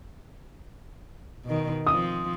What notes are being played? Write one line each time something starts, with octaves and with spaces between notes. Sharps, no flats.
B2 D#3
F3 C4 D#6